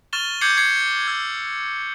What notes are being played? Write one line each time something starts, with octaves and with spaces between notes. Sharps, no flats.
C#6 F6 A6 E7 F7 G7
D6 G6 G#6 C7 C#7 F#7
C#6 G#6 C7 C#7
E6 G#6